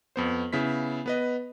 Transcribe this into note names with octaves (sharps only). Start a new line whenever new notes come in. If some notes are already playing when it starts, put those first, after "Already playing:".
F2 B3 C5
C#3 B3 E4 B6
B3 B4 D#5